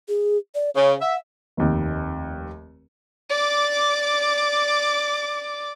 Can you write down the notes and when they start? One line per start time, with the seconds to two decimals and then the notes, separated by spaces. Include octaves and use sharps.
0.08 G#4
0.55 D5
0.75 C#3 C#5
1.01 E5 F#5
1.57 F1 D#2
3.30 D5 D6